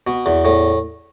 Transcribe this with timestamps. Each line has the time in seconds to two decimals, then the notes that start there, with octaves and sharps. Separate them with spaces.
0.07 B2
0.26 E2
0.45 A2